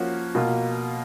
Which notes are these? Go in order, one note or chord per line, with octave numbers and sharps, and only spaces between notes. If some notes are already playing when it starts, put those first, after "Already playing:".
Already playing: F3 A#3 C#4 F#4
B2 A#3 F4